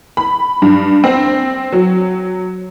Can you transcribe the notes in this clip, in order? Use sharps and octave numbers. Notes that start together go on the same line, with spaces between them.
B5
G2
C4
F#3